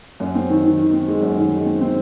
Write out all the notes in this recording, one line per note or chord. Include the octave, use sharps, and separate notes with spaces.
F#2
C4
D#3
D#3
D#3
C4
G#3
F#2
D#3
G#3
C4
C4